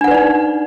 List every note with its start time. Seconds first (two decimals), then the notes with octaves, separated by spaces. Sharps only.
0.01 D4
0.04 F#5
0.08 B4
0.11 D5
0.14 D#4